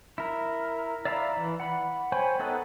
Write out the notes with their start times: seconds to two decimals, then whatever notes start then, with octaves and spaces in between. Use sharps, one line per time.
0.18 E4 A#4
1.05 D5 E5 F5 A#5 B5
1.37 E3
1.60 F#5 B5
2.12 C5 C#5 G5 G#5 B5
2.39 B3 D#4 A4 D#5 F#5